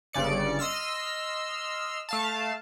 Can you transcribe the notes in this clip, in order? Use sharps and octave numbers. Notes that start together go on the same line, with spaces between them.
G1 G2 C#3 D5 C#7
D#5 C6 E6 F6
A3 F5 A5